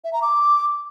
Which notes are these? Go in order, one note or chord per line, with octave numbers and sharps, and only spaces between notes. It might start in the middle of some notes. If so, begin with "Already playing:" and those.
E5
A#5
D6